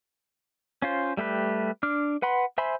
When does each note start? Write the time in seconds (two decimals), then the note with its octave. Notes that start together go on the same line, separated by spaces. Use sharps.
0.82 C#4 F4 C5
1.17 G3 A3 G4 B4
1.83 D4 D6 F6
2.22 B4 F#5 B5 C6
2.58 C5 E5 G#5 B5 C6